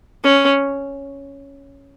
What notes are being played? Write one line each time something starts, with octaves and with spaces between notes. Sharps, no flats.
C#4